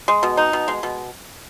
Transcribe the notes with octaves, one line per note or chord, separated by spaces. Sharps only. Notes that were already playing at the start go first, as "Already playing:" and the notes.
G#3
B2
D#4
B2
G#3
B2